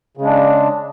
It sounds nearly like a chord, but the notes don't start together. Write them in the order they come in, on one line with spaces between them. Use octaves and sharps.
C#3 G#3 D4